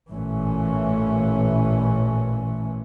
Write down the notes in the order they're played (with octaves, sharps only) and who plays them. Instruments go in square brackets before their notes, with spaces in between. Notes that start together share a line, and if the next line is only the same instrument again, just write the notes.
[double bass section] A1 A#2 E3 A3 C#4